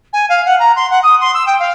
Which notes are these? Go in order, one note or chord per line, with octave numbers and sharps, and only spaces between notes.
G#5
F5
F#5
A#5
C6
F#5
D#6
C6
E6
G5
F5